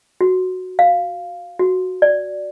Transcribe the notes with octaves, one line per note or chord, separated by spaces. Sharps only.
F#4
F5
F#4
D5